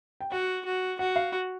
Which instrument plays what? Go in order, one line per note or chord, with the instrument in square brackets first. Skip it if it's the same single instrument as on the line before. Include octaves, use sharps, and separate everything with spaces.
[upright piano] G5
[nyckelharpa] F#4 [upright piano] F#5
[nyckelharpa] F#4
[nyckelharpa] F#4 [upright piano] F#5
[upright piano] F5